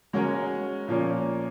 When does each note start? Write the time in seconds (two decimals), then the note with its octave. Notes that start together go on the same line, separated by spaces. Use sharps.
0.13 G#3 C#4 F#4 A#4 C#5
0.88 A#2 F3 A#3 C#4